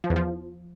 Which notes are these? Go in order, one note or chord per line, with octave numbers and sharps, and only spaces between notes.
F3
E2
F3